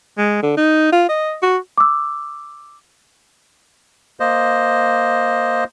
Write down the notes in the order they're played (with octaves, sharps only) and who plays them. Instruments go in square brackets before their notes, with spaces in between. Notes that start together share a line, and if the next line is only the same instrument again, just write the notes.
[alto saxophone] G#3
D3
D#4
F4
D#5
F#4
[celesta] D6 E6
[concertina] A#3 C5 D#5